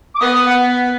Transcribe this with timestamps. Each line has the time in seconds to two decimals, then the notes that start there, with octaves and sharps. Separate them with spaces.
0.14 D6
0.19 B3 D#6
0.45 F#5